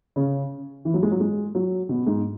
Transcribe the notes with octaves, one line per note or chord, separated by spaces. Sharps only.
C#3
E3
F#3
G#3
F#3
G#3
F#3
B2
G#2